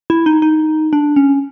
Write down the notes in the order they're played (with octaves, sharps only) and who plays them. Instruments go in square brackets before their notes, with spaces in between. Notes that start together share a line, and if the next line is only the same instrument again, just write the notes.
[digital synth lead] E4
D#4
D#4
D4
C#4